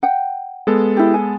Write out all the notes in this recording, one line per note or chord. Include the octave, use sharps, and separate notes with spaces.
F#5 G5
G#3 B3 A4
E4 G4
G#5